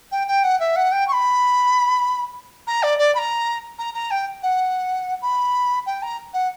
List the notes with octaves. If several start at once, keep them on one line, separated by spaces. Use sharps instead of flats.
G5
G5
F#5
E5
F#5
G5
C#6
B5
A#5
D5
D5
B5
A#5
A#5
A#5
G5
F#5
B5
G5
A#5
F#5